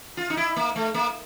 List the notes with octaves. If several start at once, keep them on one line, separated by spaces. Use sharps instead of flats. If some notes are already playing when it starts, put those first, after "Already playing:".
F4
D#4
E4
A#3
A3
A#3